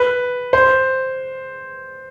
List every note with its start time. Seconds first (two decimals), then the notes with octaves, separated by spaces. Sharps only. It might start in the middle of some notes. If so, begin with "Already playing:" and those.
Already playing: B4
0.53 C5